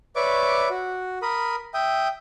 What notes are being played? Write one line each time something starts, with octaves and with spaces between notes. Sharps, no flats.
B4 C#5 D5 E5 C#6 D6
F#4
A#4 B5 D#6
E5 G5 D#6